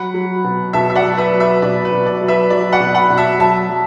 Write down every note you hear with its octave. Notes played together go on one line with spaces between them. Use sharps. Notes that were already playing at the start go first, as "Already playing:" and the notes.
Already playing: F#3 F#5 B5
F#3
B2
B2 E5 A5
E5
D5 F#5
F#3
B4 E5
F#3
B4 E5
B2 D5
B4
B2
D5
F#3
B4 E5
F#3 D5
D5 F#5
B2
F#5 B5
B2
E5 A5
F#3 E5 A5
F#3